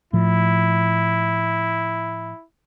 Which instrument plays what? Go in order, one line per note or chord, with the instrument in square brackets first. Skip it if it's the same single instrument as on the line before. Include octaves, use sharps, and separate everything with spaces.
[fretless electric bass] A2 F3 [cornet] E4